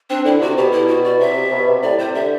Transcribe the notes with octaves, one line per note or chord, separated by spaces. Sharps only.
C4 D4
D3 E4
C3 F#4
B2 G4
E4
F#4
D5
C3 E5
C3
B2
C3
A2 D5
C3 C5
D3 E5